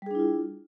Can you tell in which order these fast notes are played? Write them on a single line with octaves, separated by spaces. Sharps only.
G3 G#4 D4 E4 F4